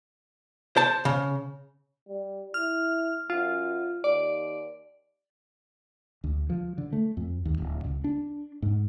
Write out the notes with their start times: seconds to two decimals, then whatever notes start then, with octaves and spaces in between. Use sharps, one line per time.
0.76 C5 A5
1.05 C#3
2.08 G3
2.54 E4 F6
3.30 F#2 F4
4.04 D#2 D5
6.24 D2
6.50 F3
6.78 D3
6.93 A3
7.17 F2
7.45 D#2
7.58 D1
7.85 C#2
8.04 D4
8.62 G#2